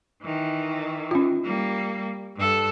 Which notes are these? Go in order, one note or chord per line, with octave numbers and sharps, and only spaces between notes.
D#3 E3
C#4 F4
G3 A#3
G2 A4